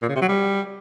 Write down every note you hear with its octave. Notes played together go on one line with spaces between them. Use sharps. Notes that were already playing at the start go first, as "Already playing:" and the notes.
A#2
C#3
C3
F#3
G3